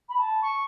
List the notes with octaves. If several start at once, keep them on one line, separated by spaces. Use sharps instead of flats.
B5
A5
C#6